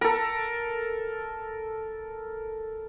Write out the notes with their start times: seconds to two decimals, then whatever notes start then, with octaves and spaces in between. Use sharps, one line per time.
0.01 A4 A#4